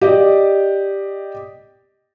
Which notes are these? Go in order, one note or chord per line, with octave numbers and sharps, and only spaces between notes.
G4 D5 D#5